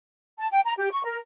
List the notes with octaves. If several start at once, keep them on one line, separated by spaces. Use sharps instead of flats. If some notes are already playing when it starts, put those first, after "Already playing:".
A5
G5
A#5
G4
C#6
A#4